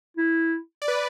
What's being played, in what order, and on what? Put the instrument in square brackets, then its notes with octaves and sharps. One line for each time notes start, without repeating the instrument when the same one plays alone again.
[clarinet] E4
[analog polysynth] D5
B4